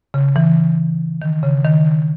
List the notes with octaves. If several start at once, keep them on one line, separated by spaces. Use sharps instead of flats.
C#3
E3
D#3
C#3
D#3